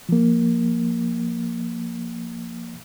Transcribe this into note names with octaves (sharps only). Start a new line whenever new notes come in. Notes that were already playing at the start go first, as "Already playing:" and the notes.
F3 A#3